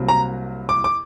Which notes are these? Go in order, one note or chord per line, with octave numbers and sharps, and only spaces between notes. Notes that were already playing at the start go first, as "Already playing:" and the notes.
Already playing: C2 C3 F#3 A#3
A#5
D6
D6